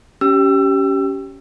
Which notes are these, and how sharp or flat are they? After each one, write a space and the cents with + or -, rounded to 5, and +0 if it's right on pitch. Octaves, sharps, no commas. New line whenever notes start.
C#4 +15 G4 -20 E6 +25